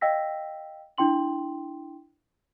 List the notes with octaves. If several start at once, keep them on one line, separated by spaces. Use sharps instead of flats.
D#5 F5 G5 E6 A#6 B6
D4 E4 G5 C6 F#7